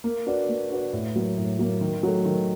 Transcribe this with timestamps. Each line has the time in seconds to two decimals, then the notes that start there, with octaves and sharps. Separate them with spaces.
0.04 A#3
0.26 D4 F#4 B4 D5
0.49 A#3
0.71 D4 F#4 B4 D5
0.93 A2
1.16 F#3 A#3
1.38 A2
1.59 F#3 A#3
1.81 D#3
2.03 F#3 A3
2.25 D#3